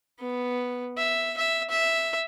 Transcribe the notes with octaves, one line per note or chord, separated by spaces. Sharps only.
B3
E5
E5
E5